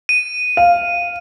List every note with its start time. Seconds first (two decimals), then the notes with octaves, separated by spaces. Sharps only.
0.09 D#7
0.57 F5